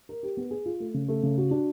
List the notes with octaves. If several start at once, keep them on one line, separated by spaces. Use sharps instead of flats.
A#4
G4
B3
G#4
F4
A3
C#3
A3
C#3
F#4
D4